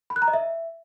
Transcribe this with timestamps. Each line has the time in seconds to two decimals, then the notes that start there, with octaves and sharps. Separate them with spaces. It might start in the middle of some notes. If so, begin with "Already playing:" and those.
0.10 B5
0.16 F#6
0.22 A#5
0.28 D#5
0.34 E5